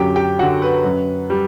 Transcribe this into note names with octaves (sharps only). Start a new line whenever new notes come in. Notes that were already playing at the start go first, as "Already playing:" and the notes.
Already playing: F#2 D3 F#3 G4 G5
G4 G5
D3 F#3 F#4 F#5
B4
F#2
G3